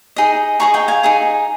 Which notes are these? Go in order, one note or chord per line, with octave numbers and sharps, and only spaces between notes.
D#4 G#4 D#5
D#4 G#4 D#5 A#5 C#6
D#5 G5
F5 G#5
D#4 G#4 D#5